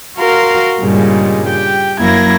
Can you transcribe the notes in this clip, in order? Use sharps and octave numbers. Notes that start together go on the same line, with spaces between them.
F#4 A#4 F5 C6
G2 A#2 C#3 G3 G#3
G4 G5
F#2 F#3 A#3 E4 G#6 A#6